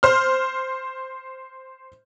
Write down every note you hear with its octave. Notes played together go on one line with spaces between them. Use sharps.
C5 F6